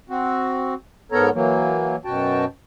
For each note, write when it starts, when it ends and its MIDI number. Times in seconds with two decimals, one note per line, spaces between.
0.09 0.74 60
0.09 0.74 66
1.12 1.29 44
1.12 1.29 59
1.12 1.29 69
1.12 1.29 70
1.12 1.29 73
1.12 1.29 82
1.33 1.96 52
1.33 1.96 54
1.33 1.96 58
2.05 2.45 42
2.05 2.45 47
2.05 2.45 66
2.05 2.45 79
2.05 2.45 81